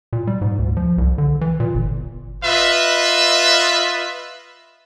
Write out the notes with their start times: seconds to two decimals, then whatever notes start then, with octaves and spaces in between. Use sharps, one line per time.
0.13 A#2
0.27 G3
0.41 G#2
0.59 D2
0.77 F3
0.98 C2
1.18 D3
1.41 E3
1.60 A#2
1.75 G1
2.44 F4 B4 D#5 E5